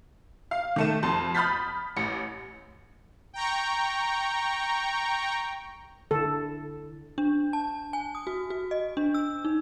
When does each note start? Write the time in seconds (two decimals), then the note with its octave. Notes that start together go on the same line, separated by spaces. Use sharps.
0.51 F5
0.76 D#3 A3 E7
1.03 F2 A5 C6
1.35 B5 D#6 F6 G6 A6 B6
1.97 A1 C#7
3.33 G5 A#5 C#6
6.11 D3 E4 A4
7.18 D4
7.53 A5
7.93 G#5
8.15 D#6
8.27 F#4
8.50 F#4
8.71 D#5
8.97 D4
9.14 E6
9.45 D#4